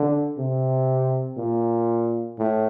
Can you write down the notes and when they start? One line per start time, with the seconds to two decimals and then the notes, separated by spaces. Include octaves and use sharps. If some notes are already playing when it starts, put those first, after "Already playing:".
Already playing: D3
0.38 C3
1.37 A#2
2.39 A2